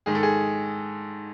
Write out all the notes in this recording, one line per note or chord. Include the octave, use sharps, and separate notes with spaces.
G#2 D#3 G#4
A4
G#4